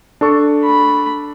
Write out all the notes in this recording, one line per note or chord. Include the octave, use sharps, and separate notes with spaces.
D4 A4 C#6
B5